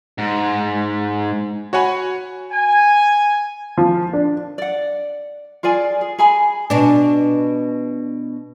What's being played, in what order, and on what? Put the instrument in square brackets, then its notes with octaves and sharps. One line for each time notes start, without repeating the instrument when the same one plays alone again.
[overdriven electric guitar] G#2
[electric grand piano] F#4 C#5 F#5 G#5 B5
[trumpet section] G#5
[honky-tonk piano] F3
D4
[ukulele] D5 F#5
F4 G#4 D5 G#5
G#4
G#4 G#5 B5
[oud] B2 D4